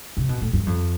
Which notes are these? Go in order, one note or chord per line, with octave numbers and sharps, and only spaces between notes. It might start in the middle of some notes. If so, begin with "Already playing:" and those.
C3
B2
A2
G2
F2